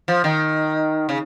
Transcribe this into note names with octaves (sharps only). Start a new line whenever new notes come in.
F3
D#3
C#3